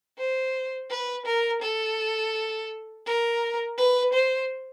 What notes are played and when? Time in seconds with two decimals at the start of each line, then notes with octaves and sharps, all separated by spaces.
0.18 C5
0.90 B4
1.26 A#4
1.62 A4
3.06 A#4
3.77 B4
4.13 C5